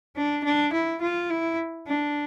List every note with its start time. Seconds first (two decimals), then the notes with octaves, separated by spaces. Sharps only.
0.16 D4
0.44 D4
0.73 E4
1.01 F4
1.30 E4
1.87 D4